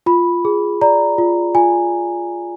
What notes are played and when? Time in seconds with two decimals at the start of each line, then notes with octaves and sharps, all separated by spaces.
0.06 F4 B5
0.45 G#4
0.81 D5 A#5
1.18 F4
1.55 F4 G#5